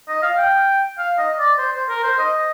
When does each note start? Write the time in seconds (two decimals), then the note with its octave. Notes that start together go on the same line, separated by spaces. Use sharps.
0.08 D#5
0.23 F5
0.38 G5
0.98 F5
1.18 D#5
1.38 D5
1.58 C5
1.73 C5
1.89 A#4
2.03 C5
2.19 D#5